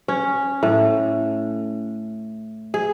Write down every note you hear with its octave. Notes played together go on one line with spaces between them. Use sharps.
C#4
A2
G#4